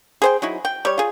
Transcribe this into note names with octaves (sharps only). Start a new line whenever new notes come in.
G#4 C5 G5
F#3 D#4 E4
G5
G3 C#5
F4 G#4